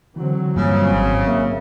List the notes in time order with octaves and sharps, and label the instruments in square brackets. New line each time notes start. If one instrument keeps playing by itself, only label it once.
[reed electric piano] D3 E3 [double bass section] F#3 C4
[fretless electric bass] G2 A#2 [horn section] C#3
[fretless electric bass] G#1
[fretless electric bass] A#3 [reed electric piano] A#4 E5